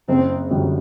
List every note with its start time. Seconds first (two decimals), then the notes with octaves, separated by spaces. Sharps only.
0.08 F#1 C4
0.51 F#2 D3 G3